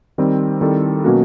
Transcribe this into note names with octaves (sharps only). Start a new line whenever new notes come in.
D#3 G3 C4
D#3 G3 C4 E4 A4
B2 F#3 A#3 C#4 F#4